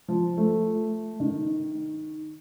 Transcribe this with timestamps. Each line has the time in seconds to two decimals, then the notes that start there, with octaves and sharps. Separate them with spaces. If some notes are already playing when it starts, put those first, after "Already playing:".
0.08 F3
0.37 A3
1.20 D#3